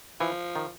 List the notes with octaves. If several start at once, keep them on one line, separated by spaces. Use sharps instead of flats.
E3 F3
D#3